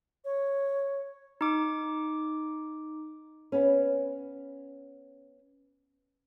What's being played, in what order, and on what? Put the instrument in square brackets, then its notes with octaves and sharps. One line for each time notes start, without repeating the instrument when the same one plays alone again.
[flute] C#5
[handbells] D#4 D6
[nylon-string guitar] B3 C#4